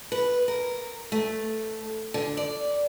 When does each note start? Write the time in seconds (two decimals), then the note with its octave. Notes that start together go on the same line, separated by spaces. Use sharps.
0.12 B4
0.48 A#4
1.12 A3
2.14 D3
2.37 D5